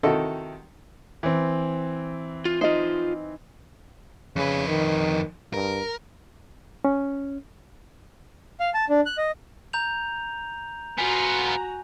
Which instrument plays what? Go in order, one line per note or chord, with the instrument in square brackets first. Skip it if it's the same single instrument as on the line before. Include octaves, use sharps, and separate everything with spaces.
[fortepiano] C3 D#3 D#4 E4 F#4 A4
[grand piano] E3 C4
[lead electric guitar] F4
[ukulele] D#4 D#5 [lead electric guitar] F4 C5
[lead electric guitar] F2 B4 [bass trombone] C#3
[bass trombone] D#3
[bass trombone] G2 [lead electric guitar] A#4
[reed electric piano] C#4
[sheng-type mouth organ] F5
A5
D4
F#6
D#5
[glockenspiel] A#5 G6 F7
[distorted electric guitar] B3 F4 [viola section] F#4 A#5 [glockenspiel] G#5